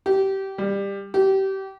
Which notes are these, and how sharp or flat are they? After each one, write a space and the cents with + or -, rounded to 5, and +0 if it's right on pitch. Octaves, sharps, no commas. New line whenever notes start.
G4 -20
G3 +20
G4 -25